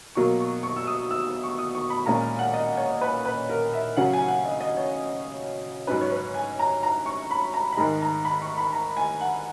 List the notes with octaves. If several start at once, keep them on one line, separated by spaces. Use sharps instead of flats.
B2 F#3 A#3 C#6
C#6
C#6
E6
D#6
E6
E6
C#6
D#6
C#6
B5
A#2 G#3 C#4 A#5
F#5
D#5
C#5
B4
B4
A#4
E5
C#3 F#3 C#4 F#5
G#5
F#5
D#5
D#5
C#5
G#2 F#3 C#4 B4
C#5
B4
G#5
A#5
A#5
C#6
B5
A#5
B5
G#2 D#3 G#3 A#5
A#5
B5
C#6
B5
A#5
G#5
F#5